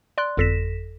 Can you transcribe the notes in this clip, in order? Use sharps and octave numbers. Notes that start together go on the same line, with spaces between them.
D5 C6 F#6
G1 F2 A4 A#6 B6 E7